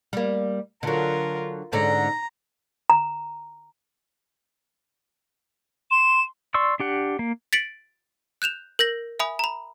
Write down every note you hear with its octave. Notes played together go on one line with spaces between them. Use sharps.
G3 A#3
D3 F#3 F4 A#4
G#2 D3 C#4 A#5
A#5
C6 E7
D5 C6 C#6 E6
D4 G4 F#5
A#3
A6 B6 C#7 D7 F#7
F#6 G6 E7 F7
A#4 G6 A#6 F#7
E5 G#5 B5 D#6
A#5 B5